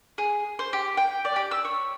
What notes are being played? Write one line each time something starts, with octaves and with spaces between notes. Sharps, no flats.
G#4
C5
G4
G5
D5
G4
E6
C#5